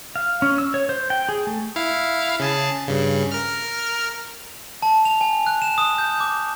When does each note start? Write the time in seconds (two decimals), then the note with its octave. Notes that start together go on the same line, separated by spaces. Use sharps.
0.16 F5
0.42 C#4
0.58 E6
0.74 C#5
0.89 C5
1.10 G5
1.29 G#4
1.47 A3
1.76 E4 F5
2.40 C#3 G#4 A5
2.87 G2 C#3
3.31 A#4 F6
4.82 A5
5.05 F7
5.21 G#5
5.46 F#6
5.62 E7
5.78 D#6
5.98 G6
6.20 D6